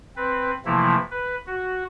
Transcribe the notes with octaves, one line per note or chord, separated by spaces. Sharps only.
C4 B4
C3 E3 F3 A3 A#3 E4
B4
F#4